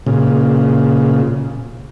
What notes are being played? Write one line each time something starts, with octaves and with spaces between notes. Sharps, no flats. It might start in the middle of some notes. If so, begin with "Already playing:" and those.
A#2 C#3